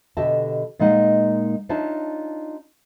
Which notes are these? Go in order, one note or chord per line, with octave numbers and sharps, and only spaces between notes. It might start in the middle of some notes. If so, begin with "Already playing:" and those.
B2 D3 G4 D#5 E5 A5
A#2 G#3 A#3 D#4 F#5
D4 D#4 F4 C#5 E5 A5